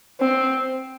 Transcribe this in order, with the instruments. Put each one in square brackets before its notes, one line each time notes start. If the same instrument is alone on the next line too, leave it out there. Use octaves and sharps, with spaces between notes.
[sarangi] C4